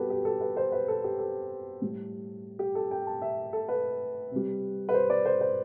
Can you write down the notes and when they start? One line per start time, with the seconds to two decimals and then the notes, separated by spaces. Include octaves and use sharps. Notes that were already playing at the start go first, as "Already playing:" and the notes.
Already playing: B2 G3 F#4 G4 A4 B4
0.10 G4
0.25 A4
0.41 B4
0.57 C5
0.72 B4
0.88 A4
1.04 G4
1.19 A4
1.82 A2 G3
2.59 G4
2.75 A4
2.91 G5
3.07 A5
3.22 E5
3.53 A4
3.69 B4
4.31 C3 G3
4.89 B4
4.94 C5
5.10 D5
5.25 C5
5.41 C5